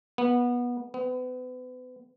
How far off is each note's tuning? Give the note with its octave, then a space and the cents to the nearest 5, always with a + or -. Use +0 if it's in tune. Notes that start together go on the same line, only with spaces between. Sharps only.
B3 -20
B3 +35